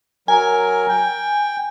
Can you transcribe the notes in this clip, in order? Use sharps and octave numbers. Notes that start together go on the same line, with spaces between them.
F#3 A#4 G#5
G5